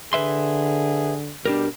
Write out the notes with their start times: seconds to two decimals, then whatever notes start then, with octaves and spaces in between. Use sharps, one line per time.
0.13 D3 G#4 B4 E5 C6
1.46 B2 G3 D4 G4 A#4